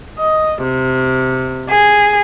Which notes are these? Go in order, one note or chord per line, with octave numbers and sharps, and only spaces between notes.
D#5
C3
G#4